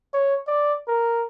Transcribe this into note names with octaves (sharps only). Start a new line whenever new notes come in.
C#5
D5
A#4